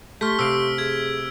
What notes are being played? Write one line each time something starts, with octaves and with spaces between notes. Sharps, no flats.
A3 G4 C6 C#6 F6 B6
C3 F5 E6 D7
G#4 G#6